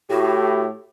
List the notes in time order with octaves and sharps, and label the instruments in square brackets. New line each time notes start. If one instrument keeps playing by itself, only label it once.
[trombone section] A2 [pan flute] F#4 [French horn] G4